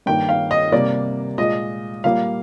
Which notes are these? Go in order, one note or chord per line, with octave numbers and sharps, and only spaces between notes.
G2 D#3 A#3 G5
F5
D#5
C3 G3 A#3 D5
A#2 G#3 D#5
A#2 G3 A#3 F5